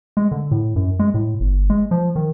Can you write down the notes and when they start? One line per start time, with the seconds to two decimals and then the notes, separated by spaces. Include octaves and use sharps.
0.17 G#3
0.32 D3
0.51 A2
0.76 F#2
0.99 G#3
1.14 A2
1.40 G1
1.70 G#3
1.91 F3
2.16 D#3